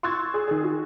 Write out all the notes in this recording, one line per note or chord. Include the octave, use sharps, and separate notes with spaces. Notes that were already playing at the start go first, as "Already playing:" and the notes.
C6 C#6 E6 F#6 G#6 A6
G#4
D#3 G#4
F#4